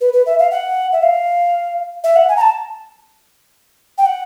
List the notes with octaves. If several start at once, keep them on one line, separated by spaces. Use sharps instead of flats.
B4
B4
E5
F5
F#5
E5
F5
E5
F#5
G#5
A#5
A5
G5
F#5